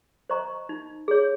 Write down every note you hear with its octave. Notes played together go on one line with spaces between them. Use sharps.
C5 D#5 A#5 C#6
D#4
G#4 C#5